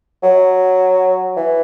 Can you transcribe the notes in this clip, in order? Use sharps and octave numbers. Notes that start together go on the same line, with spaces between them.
F#3
E3